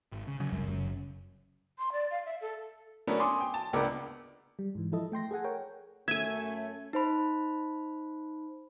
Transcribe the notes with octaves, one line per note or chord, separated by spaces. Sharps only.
G#1
C#3
C#3 F#3
F1 F#2 G3
F#1
C6
D5
F5
E5
A4
A3 B3 C#4 D4 A4 A#4
G#5 C6 D6 D#6
G5
A5
C#2 A#3 B3 D4 A#4 D6
G3
G#2 E3
F3 E4 A4 D#5
A3 G5 C6 A#6
G#4 A4 F#5 G#5
A#4 C#5 G5
F#2 A3 C#4 E5 G#5 G#6
D#4 C5 B5